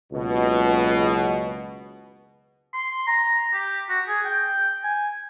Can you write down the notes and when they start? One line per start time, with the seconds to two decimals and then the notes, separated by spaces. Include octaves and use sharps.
0.13 F#1 C#2 B2
2.73 C6
3.07 A#5
3.53 G4
3.89 F#4
4.08 G#4
4.25 G5
4.83 G#5